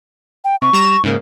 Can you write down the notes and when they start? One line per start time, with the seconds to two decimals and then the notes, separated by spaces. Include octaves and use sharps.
0.45 G5
0.62 C3 C#6
0.73 G3 A#5 E7
1.04 G#2 C#3 A#3